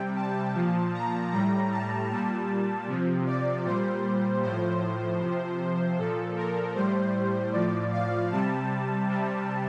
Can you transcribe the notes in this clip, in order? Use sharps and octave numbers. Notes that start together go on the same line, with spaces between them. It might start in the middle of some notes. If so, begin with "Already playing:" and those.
Already playing: C3 G3 G5
A5
A#2 F3
A#5
A2 G3 A#5
A5
A#2 G3 A5
C3 F3
D5
A#2 G3 C5
A2 F3 C5
C3 F3
A#2 F3 A4
A#4
A2 G3 C5
A2 F3 D5
F5
C3 G3 A5
C3 G3